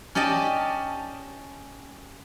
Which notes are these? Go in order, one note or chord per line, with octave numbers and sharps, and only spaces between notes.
C#4 G4 D5 D#5 A5